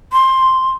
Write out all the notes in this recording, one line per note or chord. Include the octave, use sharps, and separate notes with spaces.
C6